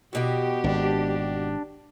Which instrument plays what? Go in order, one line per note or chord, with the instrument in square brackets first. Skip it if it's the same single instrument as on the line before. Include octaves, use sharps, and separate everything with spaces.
[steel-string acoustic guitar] E2 B2 F#4 [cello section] G4
[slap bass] G#1 [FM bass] D4